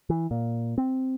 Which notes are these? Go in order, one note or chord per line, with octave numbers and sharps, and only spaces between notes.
E3
A#2
C4